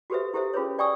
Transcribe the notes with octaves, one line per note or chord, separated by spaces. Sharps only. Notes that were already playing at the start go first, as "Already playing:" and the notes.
F#4 G4 A4 B4 C5 E5
E4 G4 A4 C5 E5
C#4 F4 G#4 B4 C#5
D5 G5 G#5 C#6 D#6 E6